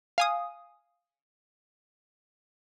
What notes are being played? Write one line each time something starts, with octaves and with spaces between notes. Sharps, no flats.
F5 G#5 D#6